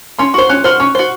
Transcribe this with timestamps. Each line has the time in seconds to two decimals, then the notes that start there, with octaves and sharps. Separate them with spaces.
0.19 C#4 C6
0.34 F#4 C5 C#6
0.49 C#4 F#6
0.64 F#4 C5 F6
0.80 C#4 C#6
0.95 F#4 C5